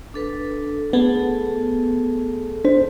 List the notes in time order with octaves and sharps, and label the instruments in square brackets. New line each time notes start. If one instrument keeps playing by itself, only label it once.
[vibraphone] D4 A4 B4
[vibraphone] A3 G#4 A4 [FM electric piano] B3
[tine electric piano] D4 C5